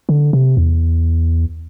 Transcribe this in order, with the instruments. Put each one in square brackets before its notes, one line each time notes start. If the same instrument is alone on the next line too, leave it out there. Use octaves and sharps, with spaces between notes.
[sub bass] D3
C3
E2